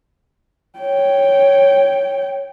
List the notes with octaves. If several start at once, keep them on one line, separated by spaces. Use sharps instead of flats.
C#5 G5